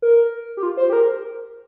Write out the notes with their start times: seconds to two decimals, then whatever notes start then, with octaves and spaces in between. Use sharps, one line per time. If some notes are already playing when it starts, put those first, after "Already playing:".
0.02 A#4
0.57 G4
0.63 F4
0.77 C5
0.90 G4
0.93 A#4